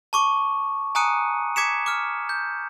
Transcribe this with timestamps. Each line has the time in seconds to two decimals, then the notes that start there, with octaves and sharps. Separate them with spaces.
0.13 A5 C#6 D6
0.95 G#5 A#5 D#6 F#6 C#7 D#7
1.56 D6 G#6 B6 C#7 E7
1.86 D6 F6
2.29 G6